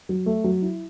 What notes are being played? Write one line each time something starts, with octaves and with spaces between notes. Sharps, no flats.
F#3
A3
F#3
E4